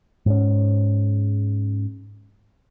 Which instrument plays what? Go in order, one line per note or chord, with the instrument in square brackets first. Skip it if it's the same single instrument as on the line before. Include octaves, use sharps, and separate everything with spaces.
[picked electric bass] G#2 C#4